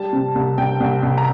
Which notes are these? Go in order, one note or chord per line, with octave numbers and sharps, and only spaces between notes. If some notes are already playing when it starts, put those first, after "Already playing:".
Already playing: G3 A5
C3
C2
C2 G5
C2
C2
A#5